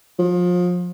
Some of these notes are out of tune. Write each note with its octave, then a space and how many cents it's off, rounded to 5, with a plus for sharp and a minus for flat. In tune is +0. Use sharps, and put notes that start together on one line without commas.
F3 +30